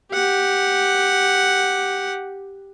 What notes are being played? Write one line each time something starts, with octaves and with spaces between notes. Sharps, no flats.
G4 F#5